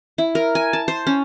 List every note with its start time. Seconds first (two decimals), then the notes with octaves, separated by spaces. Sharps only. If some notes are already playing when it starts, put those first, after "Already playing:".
0.18 E4
0.35 A#4
0.55 G#5
0.73 A5
0.88 C5
1.07 C#4